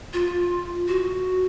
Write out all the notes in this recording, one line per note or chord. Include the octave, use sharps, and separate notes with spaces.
F4
F#4